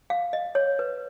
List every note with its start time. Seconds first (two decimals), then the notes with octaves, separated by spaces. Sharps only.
0.10 F5
0.33 D#5
0.55 C#5
0.79 B4